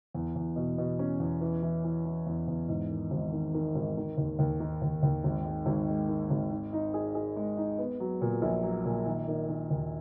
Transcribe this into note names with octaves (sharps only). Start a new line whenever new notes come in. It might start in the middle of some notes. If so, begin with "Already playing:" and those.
E2
E2
B2
B2
C#4
E2
E3
E3
E3
E3
E2
E2
G#2
D#3
G#1
D#3
D#3
G#1
D#3
D#2
D#2
D#3
D#2
D#2
G#1
G#3
G#1
G#3
D#3
G#1
D#3
D#4
G#4
G#4
G#3
D#4
B3
F#3
A#2
A#1
F#3
A#2
D#3
D#3
D#3
D#2